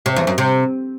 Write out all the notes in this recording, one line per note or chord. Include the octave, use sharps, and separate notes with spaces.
C3
E2
F#2
C3